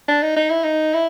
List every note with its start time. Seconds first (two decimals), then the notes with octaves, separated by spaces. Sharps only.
0.08 D4
0.22 D#4
0.36 D#4
0.50 E4
0.63 D#4
0.94 E4